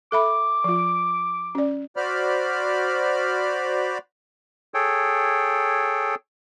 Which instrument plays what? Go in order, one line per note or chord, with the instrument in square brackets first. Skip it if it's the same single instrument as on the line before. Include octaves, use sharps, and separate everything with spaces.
[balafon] A4 E5 B5 [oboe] D6
[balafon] F3 F4
C#4 D5
[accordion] F#4 C5 D5 B5 F6
[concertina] G#4 A4 C#5 G5